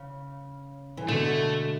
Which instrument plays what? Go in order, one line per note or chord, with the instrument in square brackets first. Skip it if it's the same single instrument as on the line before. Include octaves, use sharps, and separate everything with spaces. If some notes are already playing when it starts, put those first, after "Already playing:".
Already playing: [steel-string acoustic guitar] C#3
E3
[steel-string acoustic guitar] B2 D3 [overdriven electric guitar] A3